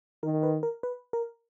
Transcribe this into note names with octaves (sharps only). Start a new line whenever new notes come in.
D#3 A#4
B4
A#4
B4
A#4